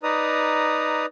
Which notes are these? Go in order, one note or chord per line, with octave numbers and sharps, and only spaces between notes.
D#4 B4 D5 A#5 D#6